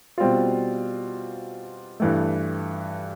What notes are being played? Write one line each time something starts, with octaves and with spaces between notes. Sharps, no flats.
B2 G3 C4 F4
G2 E3 A3